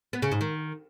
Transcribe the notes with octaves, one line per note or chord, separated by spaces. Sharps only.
B3
C#3
G#2
D#3